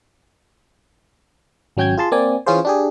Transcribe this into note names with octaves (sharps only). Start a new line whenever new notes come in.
G#1 F#3 C#4 G5 G6 G#6
F4 G#4 A5 C6
A#3 C4 D5 G#5
E3 C#4 F4 G#4 C5
D4 G4 G#4